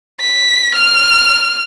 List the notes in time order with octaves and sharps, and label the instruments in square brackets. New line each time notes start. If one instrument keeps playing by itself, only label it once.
[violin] B6
F6